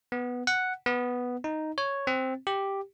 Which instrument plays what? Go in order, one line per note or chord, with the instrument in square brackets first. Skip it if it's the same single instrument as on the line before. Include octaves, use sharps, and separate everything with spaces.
[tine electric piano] B3
F#5
B3
D#4
C#5
C4
G4